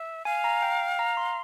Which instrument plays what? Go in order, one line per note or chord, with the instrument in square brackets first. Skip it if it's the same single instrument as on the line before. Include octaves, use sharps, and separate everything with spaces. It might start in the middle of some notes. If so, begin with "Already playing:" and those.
Already playing: [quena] E5
[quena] F5 [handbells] G#5
[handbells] A#5
G5
A#5
C6